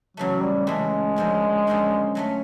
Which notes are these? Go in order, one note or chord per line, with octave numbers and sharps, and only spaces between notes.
C#3 E3 F#3 A3
G3
C#3 E3 G#3 A3
F#2 D3 F3 A#3 C#4
F#2 D3 F3 A#3 C#4
F#3 A3 C#4